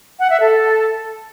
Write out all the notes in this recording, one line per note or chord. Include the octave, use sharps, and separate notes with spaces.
F#5
E5
A4